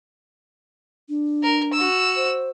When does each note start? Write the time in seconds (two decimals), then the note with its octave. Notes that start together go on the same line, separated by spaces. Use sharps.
1.09 D4
1.43 A#4
1.73 F#4 E6
2.16 C5